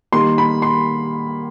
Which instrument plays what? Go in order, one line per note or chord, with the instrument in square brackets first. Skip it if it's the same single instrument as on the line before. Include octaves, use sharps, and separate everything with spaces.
[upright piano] D#3 G3 A#3 C6
B5
C6